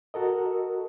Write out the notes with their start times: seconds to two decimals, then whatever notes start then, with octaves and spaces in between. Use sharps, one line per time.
0.14 F#4 A4 A#4 D#5